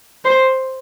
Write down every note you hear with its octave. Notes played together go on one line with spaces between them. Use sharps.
C5